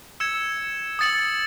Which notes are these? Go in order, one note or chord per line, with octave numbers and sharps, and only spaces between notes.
E6 G#6 C#7 E7
D#6 A6 C#7 F#7